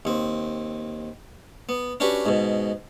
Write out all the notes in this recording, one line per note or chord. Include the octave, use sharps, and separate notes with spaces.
D#2 C4
B3
C#4 D4 F#4 G4 B4
G#2 B2